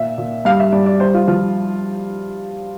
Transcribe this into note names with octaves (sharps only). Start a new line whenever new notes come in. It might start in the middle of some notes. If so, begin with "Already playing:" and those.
Already playing: A#2 E5
A#2
G2 F5
E5
G2 D5
D5
G2 C5
F4
F3 F4